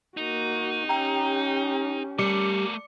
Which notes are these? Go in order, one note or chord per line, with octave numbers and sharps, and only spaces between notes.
A#3 D#4 F#4
C#4 G4 G5 A#5
G3 A3 A#4 D6 C#7